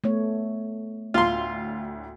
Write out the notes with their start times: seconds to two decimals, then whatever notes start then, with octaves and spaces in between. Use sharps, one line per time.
0.04 A3 B3 C#5
1.14 D2 A2 F4 C6